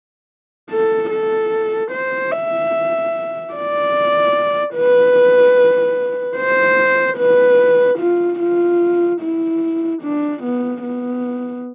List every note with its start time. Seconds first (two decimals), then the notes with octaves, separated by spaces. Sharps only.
0.71 A4
1.11 A4
1.92 C5
2.32 E5
3.54 D5
4.76 B4
6.37 C5
7.18 B4
7.99 F4
8.40 F4
9.21 E4
10.02 D4
10.43 B3
10.83 B3